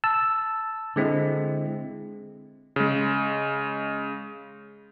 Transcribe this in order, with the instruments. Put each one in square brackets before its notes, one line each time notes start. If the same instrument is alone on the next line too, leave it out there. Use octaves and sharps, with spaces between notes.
[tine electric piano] A5 E6
D3 G#3 C4 E4
[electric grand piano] C#3 G#3